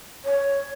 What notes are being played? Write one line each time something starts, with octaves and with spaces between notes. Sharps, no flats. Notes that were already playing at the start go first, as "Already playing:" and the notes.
C#5